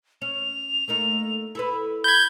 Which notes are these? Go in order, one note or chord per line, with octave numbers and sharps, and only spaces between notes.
C#4 F7
A3 A#3 D#4
E4 A4 B4
B5 G6 G#6